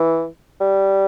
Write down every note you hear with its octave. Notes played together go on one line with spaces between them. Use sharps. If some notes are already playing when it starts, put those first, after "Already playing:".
Already playing: E3
G3